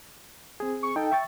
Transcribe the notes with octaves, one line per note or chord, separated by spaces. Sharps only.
C4 G#4
C#6
D#4 A4 G5
E5 C#6 A6